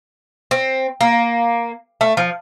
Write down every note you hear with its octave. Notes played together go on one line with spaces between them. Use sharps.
C4
A#3
A3
F3